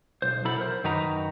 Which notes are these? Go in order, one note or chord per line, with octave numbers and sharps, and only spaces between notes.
B1 C5
B1 F#3 E4 A4 B5
A#4 C5
F#2 D#3 D#4 F#4 B4 A#5